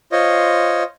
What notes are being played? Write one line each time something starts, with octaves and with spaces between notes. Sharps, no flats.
F4 C5 C#5 D#5